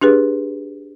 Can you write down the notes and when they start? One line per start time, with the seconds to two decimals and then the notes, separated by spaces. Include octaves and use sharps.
0.01 D4 G4 G#4 B4